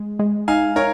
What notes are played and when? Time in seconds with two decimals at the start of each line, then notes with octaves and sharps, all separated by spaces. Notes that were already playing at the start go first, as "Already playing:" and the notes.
Already playing: G#3
0.19 G#3
0.48 D#4 F5 G#5
0.76 D#4 A#4 C#5